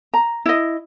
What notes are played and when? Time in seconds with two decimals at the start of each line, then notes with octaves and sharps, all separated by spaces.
0.14 A#5
0.46 E4 D#5